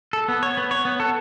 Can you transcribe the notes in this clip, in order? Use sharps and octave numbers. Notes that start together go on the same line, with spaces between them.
A4
B3
C#5
B3
C#5
B3
A4